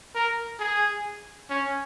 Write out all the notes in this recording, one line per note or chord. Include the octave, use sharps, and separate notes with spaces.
A#4
G#4
C#4